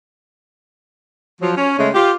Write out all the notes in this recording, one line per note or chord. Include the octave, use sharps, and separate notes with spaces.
F3 F#3
C#4
C#3 G#3 A3 C#4
F4 G4